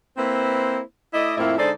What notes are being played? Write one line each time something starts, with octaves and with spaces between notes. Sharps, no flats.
A#3 C4 E4 B4 C5
A3 E4 D5 D#5
F2 A2 A#3 C4 E4
D3 G#3 D#4 A4 C5 D5